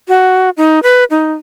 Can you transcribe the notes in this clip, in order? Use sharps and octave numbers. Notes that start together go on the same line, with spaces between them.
F#4
D#4
B4
D#4